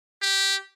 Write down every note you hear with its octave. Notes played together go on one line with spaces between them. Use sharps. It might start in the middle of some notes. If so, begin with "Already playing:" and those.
G4